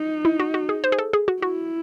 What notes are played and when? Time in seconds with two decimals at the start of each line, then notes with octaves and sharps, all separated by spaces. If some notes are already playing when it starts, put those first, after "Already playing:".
Already playing: D#4
0.25 E4
0.40 F#4
0.54 F#4
0.69 G#4
0.84 C5
0.92 G#4
0.99 A4
1.13 G#4
1.28 F#4
1.42 E4 F#4